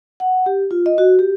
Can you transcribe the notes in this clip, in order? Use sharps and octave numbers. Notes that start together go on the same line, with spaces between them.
F#5
G4
F4
D#5
F#4
G4